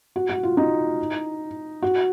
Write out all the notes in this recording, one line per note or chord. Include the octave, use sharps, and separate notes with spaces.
F#4
F#4
F4
D#4
F#4